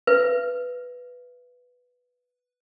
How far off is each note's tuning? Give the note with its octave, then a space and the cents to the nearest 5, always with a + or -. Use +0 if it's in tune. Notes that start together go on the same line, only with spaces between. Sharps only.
B4 +0 E5 +45